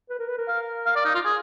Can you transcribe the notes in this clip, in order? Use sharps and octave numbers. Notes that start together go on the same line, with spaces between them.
B4
A#4
B4
A#4
F5
F5
D5
D#4
F4
G#4